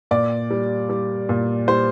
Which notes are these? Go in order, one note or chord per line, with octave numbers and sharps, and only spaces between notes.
A#2 D5
G3
G3
A#2
G3 C5